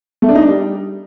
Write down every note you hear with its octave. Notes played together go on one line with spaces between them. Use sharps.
A3
D4
D#4
D4
G3